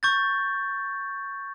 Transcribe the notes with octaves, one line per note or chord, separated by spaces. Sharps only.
C#6 G6 A6